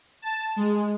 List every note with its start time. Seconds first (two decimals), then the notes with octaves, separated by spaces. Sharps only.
0.22 A5
0.56 G#3